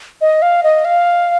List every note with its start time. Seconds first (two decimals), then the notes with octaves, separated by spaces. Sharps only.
0.21 D#5
0.42 F5
0.63 D#5
0.85 F5